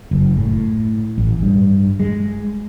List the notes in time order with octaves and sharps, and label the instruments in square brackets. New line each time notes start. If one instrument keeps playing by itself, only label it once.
[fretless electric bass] F#1
A2
A1
G2
G#3